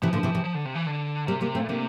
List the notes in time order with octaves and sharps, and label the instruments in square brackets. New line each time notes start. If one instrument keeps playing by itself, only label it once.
[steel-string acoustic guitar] C3 E3 [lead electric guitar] F3
[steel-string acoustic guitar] A#2 D3
C3 E3
C3 E3
[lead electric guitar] F3
D3
C3
E3
D3
[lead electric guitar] C3 [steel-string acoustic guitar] G3 A#3
[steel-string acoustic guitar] G3 A#3
A3 C4
[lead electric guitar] A#2
[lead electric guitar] C3 [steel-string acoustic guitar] A#3 D4